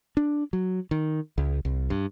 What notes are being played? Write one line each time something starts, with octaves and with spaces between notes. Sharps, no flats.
D4
F#3
D#3
C#2
C2
G2